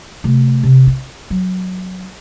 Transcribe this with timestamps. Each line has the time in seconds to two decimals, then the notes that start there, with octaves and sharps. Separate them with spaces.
0.24 C3 A3
0.63 C3
0.87 E4
1.30 F#3